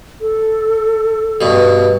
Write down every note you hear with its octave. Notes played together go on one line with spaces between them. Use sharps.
A4
G2 B2